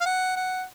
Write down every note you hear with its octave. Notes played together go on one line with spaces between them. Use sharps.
F5
F#5
F#5